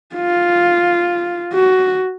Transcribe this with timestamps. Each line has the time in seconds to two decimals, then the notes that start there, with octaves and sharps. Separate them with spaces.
0.15 F4
1.53 F#4